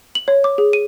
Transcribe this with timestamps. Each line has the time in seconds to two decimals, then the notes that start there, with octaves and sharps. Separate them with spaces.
0.15 F#7
0.28 C#5
0.44 D6
0.58 G#4
0.73 D#7